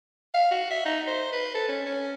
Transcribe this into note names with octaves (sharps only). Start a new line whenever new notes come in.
F5
F#4
E5
D#4
C5
B4
A4
C#4
C#4